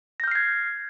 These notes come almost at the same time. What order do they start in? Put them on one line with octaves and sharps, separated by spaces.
A#6 G6 F6 C7 G#6